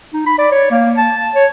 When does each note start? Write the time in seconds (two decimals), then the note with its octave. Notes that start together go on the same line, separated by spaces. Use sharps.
0.13 D#4
0.26 B5
0.38 D5
0.52 C#5
0.71 A#3
0.97 A5
1.35 C#5